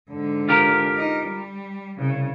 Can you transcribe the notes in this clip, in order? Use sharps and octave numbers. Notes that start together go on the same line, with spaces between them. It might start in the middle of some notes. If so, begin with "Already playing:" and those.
G#2 D3
F4 G4 A#4
D#4
G3
C2 C#3